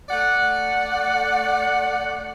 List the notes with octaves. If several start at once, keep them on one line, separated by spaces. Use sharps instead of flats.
A3 D5 F#5